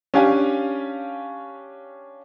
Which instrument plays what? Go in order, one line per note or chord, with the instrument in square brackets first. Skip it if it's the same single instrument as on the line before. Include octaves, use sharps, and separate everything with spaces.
[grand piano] C#4 D4 G4 F5 G#5